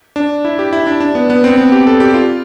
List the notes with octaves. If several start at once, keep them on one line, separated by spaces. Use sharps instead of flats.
D4
E4
G4
E4
D4
D4
B3
B3
C4
B3
G4
A4
G4
F4